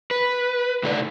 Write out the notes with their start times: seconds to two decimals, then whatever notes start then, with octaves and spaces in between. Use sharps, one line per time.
0.11 B4
0.83 A2 C3 D#3 A4 C#5 D5